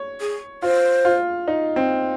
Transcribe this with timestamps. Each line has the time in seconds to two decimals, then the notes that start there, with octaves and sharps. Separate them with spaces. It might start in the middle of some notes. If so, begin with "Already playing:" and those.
Already playing: C#5
0.21 G#4
0.62 F4 C5
1.05 F4
1.48 D#4
1.76 C4